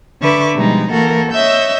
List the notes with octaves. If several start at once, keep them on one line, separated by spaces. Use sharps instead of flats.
D3 B4 E5 C#6 D6
B2 F3 G3 G#3 D#4
E3 A#3 F#4 A4 A#4
C#5 D#5 E5 E6 G6